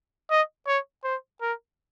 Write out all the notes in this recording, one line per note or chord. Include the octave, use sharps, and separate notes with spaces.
D#5
C#5
C5
A#4